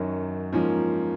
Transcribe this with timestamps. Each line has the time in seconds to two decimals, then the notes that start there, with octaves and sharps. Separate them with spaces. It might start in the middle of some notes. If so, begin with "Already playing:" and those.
Already playing: F#2 D#3 F#3 C#4
0.53 G#2 F3 A#3 C#4